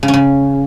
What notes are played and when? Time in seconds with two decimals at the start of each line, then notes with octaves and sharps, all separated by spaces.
0.03 C#3
0.08 C#4
0.14 C#3